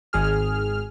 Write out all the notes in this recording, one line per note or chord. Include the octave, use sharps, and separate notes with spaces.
G#1 G#4 F6